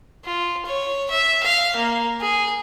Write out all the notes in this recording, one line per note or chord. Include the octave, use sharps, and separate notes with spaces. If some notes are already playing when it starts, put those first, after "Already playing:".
F4
C#5
E5
F5
A#3
G#4